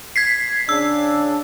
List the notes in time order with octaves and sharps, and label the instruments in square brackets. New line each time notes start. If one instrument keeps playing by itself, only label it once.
[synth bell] G#6 B6 C7
[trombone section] C#3 D4 [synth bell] E6